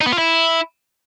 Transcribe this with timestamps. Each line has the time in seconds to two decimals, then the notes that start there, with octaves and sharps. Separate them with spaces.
0.01 D#4
0.07 B3
0.13 F4
0.18 E4